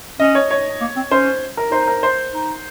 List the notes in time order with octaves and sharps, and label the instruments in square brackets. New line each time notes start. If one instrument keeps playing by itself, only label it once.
[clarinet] C#4 [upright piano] D#5
[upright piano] C#5
C#5
[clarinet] A#3
C4
[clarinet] C#4 [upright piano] C5
[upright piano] A#4
[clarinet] D#4 [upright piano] C5
[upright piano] A#4
C5
[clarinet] D#4